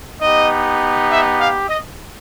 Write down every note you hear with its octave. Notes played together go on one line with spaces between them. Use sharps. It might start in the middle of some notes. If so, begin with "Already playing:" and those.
B3 D#4 G4 D#5
E5
F5
D#5